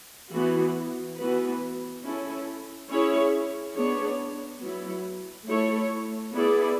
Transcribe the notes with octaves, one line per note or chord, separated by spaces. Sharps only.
E3 B3 F#4
E3 B3 F#4 B4
C#4 E4 A4
C#4 E4 G#4 C#5
B3 D4 G#4 C#5
F#3 B3 E4
A3 E4 A4 C#5
B3 E4 G#4 D5